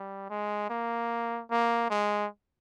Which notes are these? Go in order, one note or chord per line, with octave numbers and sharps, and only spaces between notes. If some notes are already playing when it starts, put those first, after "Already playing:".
Already playing: G3
G#3
A#3
A#3
G#3